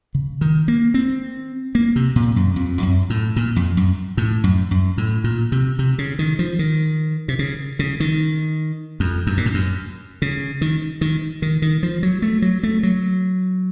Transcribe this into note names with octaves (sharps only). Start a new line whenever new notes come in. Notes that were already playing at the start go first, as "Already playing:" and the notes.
C#3
D#3
A#3
C4
A#3
C3
A#2
F#2
F2
F2
F#2
A2
A#2
F2
F#2
A2
F#2
F#2
A2
A#2
C3
C3
C#3
D#3
F3
D#3
C3
C#3
C#3
D#3
F2
F#2
A#2
A2
F#2
C#3
D#3
D#3
D#3
D#3
F3
F#3
A3
F#3
A3
F#3